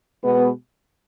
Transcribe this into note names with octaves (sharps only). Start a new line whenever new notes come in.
B2 G#3 B3